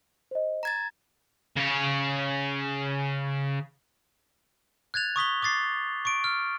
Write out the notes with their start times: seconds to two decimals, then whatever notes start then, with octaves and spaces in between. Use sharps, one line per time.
0.31 C5 D#5
0.63 A#5 G#6 A6 E7
1.57 C#3 C#5
4.94 F#6 G#6 A6 F7
5.16 C#6 D#6 B6 G7
5.42 D6 D#6 A6 C7
6.05 C#6 D7
6.24 F6